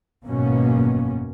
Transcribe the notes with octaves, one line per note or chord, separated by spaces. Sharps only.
G#1 F#2 B2 A#3 B3 C#4